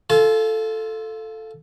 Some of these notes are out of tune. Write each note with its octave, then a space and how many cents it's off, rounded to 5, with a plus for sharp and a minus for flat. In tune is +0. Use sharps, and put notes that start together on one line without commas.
F4 +0 A4 +0 A5 -45